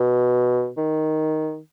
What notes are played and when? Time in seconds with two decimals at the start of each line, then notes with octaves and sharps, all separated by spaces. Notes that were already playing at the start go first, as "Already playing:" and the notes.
Already playing: B2
0.77 D#3